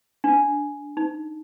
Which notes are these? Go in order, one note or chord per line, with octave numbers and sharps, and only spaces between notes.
D4
D#4